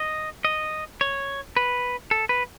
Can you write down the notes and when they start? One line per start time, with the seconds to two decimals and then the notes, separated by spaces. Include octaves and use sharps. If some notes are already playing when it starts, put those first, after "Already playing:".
Already playing: D#5
0.45 D#5
1.01 C#5
1.57 B4
2.11 A4
2.29 B4